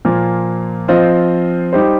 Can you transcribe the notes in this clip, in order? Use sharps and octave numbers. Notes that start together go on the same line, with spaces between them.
A#2 F3 A#3
F3 C4 F4 C5 D#5
G3 D#4 G4 C5